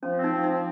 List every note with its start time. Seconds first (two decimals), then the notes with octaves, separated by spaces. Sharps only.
0.02 F3 C#4
0.18 C4
0.24 D#4
0.33 F3
0.44 D#4
0.49 C4